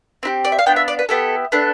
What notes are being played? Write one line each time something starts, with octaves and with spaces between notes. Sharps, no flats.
C4 E4 G4
D5
E5
F5
B3 D4 F4 G5
E5
D5
B4
B3 E4 G4 A4
B3 D4 A4